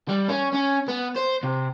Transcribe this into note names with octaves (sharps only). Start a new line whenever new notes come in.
G3
C#4
C#4
B3
C5
C3